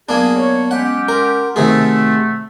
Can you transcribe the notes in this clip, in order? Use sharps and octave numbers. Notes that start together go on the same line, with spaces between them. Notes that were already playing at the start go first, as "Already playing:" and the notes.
F#3 A#3 B3 D4 G#4 G#5
C#5
G#3 C#4 G4 F#5
A#4 F#5 C6
C3 D#3 A3 G#4